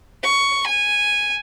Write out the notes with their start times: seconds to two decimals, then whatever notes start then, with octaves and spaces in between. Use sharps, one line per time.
0.23 C#6
0.67 G#5